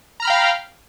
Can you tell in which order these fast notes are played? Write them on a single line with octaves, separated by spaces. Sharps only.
A#5 F6 B5 G5 F5